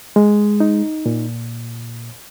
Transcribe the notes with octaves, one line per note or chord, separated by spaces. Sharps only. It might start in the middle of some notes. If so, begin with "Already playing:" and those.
G#3
D#4
A#2